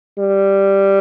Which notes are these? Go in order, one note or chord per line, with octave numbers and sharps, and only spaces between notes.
G3